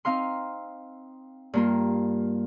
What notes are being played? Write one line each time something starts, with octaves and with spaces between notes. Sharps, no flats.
C4 D#4 F5 C6
G2 A#3 F4